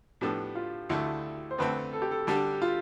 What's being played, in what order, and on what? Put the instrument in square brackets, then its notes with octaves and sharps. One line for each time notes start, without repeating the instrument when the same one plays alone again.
[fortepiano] A2 F3 B3 D4 A4 [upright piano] G4
[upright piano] F4
[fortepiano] D2 D3 A3 [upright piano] E4
[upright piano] C5
[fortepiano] F2 D3 A3 C4 [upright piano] B4
[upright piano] A4
G4
A4
[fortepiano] D3 G3 D4 A4 [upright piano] G4
[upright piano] F4